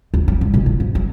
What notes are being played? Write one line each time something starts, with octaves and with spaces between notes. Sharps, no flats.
D2
F#3
G2
B2
A2
G#2
F#3